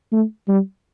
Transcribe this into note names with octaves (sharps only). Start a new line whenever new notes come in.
A3
G3